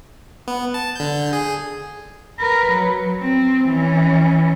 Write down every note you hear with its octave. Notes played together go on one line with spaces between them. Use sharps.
B3
A5
D3 G6
G#4
A#4 B4
F#3
C4
E3 C#4